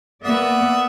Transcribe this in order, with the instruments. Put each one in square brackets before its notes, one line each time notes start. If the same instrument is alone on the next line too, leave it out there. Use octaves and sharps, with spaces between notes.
[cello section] A#3 B3 D5 [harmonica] E5 F#5 D#6